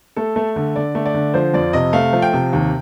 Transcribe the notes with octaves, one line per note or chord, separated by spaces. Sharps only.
A3 A4
A3
D3
D3 D5
A3
D5
D3
F3 C5
F2 D5
C3 D#5
A3 F5
F3
G5
C3
D#2